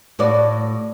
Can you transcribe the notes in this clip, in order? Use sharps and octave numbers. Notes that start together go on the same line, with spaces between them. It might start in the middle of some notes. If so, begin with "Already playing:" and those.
A2 F#4 D5